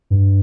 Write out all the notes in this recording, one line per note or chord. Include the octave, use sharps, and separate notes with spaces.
G2